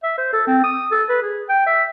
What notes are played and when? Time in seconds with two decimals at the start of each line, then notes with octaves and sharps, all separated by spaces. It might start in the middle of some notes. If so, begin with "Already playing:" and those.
0.03 E5
0.18 C5
0.33 A4
0.47 C4
0.64 D#6
0.91 A4
1.09 B4
1.22 G#4
1.49 G5
1.67 E5